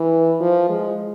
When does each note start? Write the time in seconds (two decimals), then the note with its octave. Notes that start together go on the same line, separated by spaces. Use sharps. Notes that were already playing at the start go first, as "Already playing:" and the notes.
Already playing: E3
0.41 F3
0.69 G#3